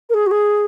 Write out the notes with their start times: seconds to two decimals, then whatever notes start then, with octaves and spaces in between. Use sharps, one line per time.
0.10 A#4
0.14 G#4
0.27 F#4
0.31 G#4